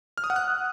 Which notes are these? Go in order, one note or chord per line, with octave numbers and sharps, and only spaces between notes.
F6
D#6
F#5
F#6